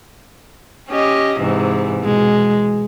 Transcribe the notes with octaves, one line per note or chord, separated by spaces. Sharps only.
C#4 G4 D#5
G#2 C3 E3
B2 G#3